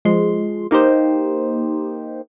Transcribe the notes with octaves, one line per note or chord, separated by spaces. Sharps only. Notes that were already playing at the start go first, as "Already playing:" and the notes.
F3 G#3 C6
A#3 D#4 G4 C5